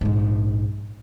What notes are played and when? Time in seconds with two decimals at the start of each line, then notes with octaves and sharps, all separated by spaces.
0.01 A#1 G#2